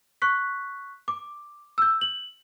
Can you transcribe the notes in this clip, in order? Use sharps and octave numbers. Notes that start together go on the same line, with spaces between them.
C#6 F#6 B6
D6
E6 G6
F#7